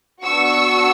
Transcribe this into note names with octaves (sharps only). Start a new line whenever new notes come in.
B3 D4 F#4 C#6 E6